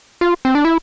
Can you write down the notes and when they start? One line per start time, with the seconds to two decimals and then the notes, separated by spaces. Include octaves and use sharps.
0.21 F4
0.45 C4
0.55 D4
0.65 E4